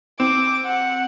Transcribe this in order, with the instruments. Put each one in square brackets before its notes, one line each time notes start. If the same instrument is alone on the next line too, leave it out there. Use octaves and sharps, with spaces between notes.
[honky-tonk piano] C4 [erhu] D6
[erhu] F#5